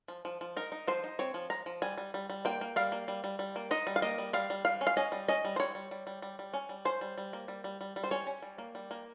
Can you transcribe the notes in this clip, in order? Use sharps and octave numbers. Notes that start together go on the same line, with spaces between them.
F3
F3
F3
D#4 A#4
D#4
F3 C5
D#4
C4 C#5
F3
F3 A#5
F3
G3 G#5
G3
G3
G3
A#3 G5
A#3
G3 F5
A#3
G3
G3
G3
A#3
D#4 D#5
G3
F5
A#3 D#5
G3
G3 F5
G3
G3 F5
C#4
F5
C#4 D#5
G3
C#4 D#5
G3
C5
G3 C#5
G3
G3
G3
G3
G3
C#4
G3
C#4 C5
G3
G3
A#3
G3
G3
G3
G3
C5
C#4 C#5
C#4
G3
A#3
G3
A#3